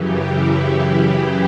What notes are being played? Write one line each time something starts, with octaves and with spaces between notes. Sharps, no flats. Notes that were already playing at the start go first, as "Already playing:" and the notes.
Already playing: F#2 C#3 E3 G4
E4